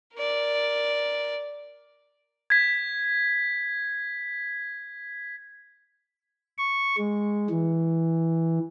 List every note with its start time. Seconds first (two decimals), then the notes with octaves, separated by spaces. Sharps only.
0.15 A#4 D5
2.50 G#6 B6
6.58 C#6
6.98 G#3
7.50 E3